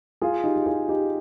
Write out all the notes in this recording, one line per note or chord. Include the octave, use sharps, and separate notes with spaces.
F4 G#4
D#4 G4
G4
F4 G#4
D#4 G4